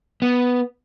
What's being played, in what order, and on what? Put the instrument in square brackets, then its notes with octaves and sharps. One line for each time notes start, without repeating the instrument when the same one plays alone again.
[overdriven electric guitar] B3